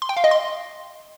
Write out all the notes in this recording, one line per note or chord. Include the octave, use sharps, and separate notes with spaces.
C6
G5
F5
D#5
C6